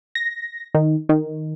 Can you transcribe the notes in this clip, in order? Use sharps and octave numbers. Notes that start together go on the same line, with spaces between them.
A#6
D#3
D#3